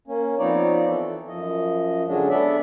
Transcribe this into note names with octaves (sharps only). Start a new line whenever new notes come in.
A#3 C#4
F3 B3 C4 D#4 C#5 D5
E3 A4
F#2 F3 D#5
D3 F#3 G#3 C#4 D4
B3 D4 A4 D5 E5